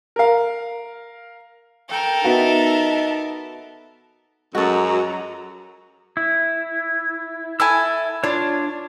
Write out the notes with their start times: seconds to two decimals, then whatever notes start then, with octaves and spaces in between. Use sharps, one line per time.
0.16 A#4 F5
1.89 A4 A#4 G5
2.24 B3 D#4 F#4 E5 A5
4.55 F#2 F#3 G#3 F#4 A4 A#5
6.17 E4
7.60 E4 A4 G#5 E6
8.24 D4 F4 C#5